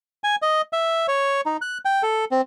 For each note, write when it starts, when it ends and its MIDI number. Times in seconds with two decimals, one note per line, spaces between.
0.24 0.36 80
0.42 0.61 75
0.73 1.07 76
1.08 1.41 73
1.46 1.57 63
1.61 1.78 90
1.85 2.03 79
2.03 2.25 69
2.31 2.41 60